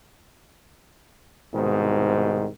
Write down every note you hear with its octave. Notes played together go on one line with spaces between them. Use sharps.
C2 G#2 B2 D#3